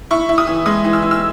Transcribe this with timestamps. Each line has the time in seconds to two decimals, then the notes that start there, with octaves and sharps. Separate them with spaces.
0.11 E4 C#6
0.29 E4
0.38 D#6
0.47 E3
0.66 G#3 D#6
0.85 E3
0.93 E6
1.02 E3
1.11 E6